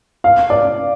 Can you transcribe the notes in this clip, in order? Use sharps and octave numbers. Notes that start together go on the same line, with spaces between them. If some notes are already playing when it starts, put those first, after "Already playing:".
F5
D5